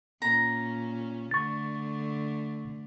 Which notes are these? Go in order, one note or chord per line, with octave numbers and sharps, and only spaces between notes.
A#2 C#4 A#5
D3 A3 C#6 A6